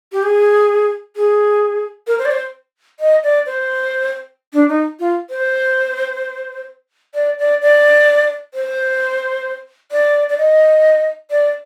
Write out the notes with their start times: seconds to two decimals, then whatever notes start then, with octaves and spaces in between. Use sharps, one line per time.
0.12 G4
0.23 G#4
1.16 G#4
2.07 A#4
2.19 C5
2.25 D5
2.31 C5
3.00 D#5
3.23 D5
3.46 C5
4.53 D4
4.69 D#4
5.00 F4
5.30 C5
7.15 D5
7.39 D5
7.62 D5
8.54 C5
9.92 D5
10.29 D5
10.38 D#5
11.31 D5